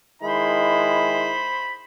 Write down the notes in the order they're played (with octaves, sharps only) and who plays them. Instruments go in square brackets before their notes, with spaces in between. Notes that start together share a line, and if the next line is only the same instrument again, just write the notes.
[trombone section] D#3 G#3 E4 [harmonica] C5 B5